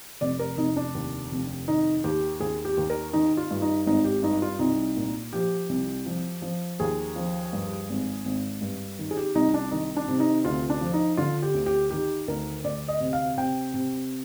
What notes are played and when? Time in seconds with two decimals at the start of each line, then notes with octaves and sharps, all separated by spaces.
0.21 F1 D5
0.39 A#4
0.57 F1 D#4
0.76 D4
0.95 D#2
1.31 F1
1.68 D#3 D#4
2.04 D#2 G4
2.40 D#2 G#4
2.65 G4
2.77 D#2
2.90 A#4
3.13 D#3 D#4
3.37 F4
3.51 G2
3.62 D#4
3.86 G#1 D#4
4.04 G4
4.23 G2 D#4
4.42 F4
4.59 C2 D#4
4.97 A#2
5.33 F3 G4
5.69 C2
6.06 F3
6.42 F3
6.80 D#2 G#4
7.16 F3
7.53 G2
7.89 G#1
8.25 G#1
8.61 G2
8.99 D#3
9.11 G#4
9.17 G4
9.35 C2 D#4
9.54 D4
9.71 D#3 D#4
9.97 D4
10.08 C3
10.20 D#4
10.45 D2 F4
10.70 D4
10.81 F3
10.93 D#4
11.17 D3 F4
11.42 G4
11.54 D2
11.66 G4
11.91 D#3 G4
12.28 D2 A#4
12.64 D2 D5
12.88 D#5
13.00 C3
13.13 F5
13.37 C3 G5
13.74 C3